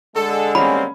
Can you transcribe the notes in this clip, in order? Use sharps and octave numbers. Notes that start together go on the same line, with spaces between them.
D3 G#3 A4
G3 A#3 C4 C#4 B5